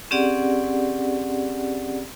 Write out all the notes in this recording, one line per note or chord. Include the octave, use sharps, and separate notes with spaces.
C4 C#4 G4 G#4 D5 F#5